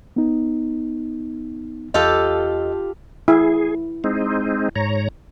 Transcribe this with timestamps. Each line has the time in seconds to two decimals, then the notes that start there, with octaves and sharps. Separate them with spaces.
0.16 B3 D#4
1.94 E2 F4 G4 A4 D#5
3.28 E4 G#4
4.04 G#3 C4 D#4
4.76 G#2 C#5 A#5